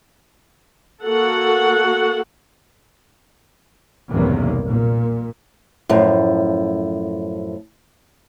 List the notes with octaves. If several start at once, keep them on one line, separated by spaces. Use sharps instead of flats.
A#3 F#4 A4 F#5
B1 E2 G2 C3 D#3 A#3
A#2
F#2 A2 F3